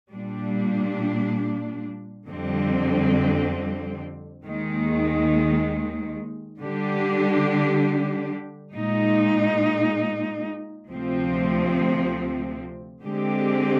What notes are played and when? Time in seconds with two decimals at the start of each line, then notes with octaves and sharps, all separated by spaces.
0.13 A#2 G3 D4
2.27 F2 D3 G3 C4
4.43 D#2 D#3 G#3
6.59 D3 G3 D4 G4
8.74 A#2 G#3 D#4
10.89 D2 C3 F3 C4
13.03 D3 G#3 C4 G4